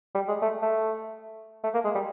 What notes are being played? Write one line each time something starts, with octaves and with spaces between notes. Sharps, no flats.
G3
G#3
A3
A3
A3
A#3
G#3
G3